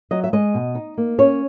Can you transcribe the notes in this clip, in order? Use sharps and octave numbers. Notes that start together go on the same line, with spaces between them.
F#3 D#5
E5
G#3 D#5
B2
D#4
A#3
C#4 C#5